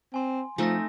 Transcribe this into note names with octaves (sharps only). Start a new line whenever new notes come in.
C4 G#5 C6
F3 A3 C4 D#4 G#5 E6 A#6